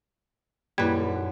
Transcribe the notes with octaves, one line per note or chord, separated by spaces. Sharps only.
D#1 F#2 G3 A#3 E4 B4